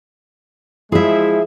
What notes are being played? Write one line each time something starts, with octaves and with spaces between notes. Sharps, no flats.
F3 G#3 E4 G#4 E5